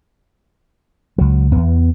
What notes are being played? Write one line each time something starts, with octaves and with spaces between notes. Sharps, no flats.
C#2 F#3
E2 B3